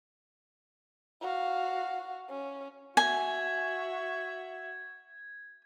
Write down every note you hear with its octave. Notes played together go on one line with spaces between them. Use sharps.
F#4 F5
C#4
F#4 E5 G#5 G#6